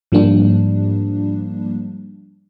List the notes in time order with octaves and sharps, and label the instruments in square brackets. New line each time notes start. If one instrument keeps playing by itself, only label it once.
[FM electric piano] G#2 F3 G3 A#3 D4